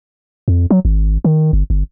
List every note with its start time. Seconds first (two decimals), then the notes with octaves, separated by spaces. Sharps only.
0.48 F2
0.71 F#3
0.85 G#1
1.25 D#3
1.53 G1
1.70 G1